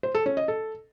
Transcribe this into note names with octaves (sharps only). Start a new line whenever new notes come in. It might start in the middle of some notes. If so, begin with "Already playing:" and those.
C5
A4
C#4
D#5
A4